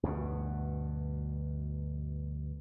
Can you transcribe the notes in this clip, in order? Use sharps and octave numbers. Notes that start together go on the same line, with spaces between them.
D2 G2 B2